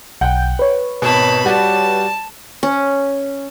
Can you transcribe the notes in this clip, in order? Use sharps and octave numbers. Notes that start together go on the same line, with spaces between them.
B1 F#5 G5 G6
B4 C#5
G#1 B2 A5 B5
G3 F#4 D5 A5
C#4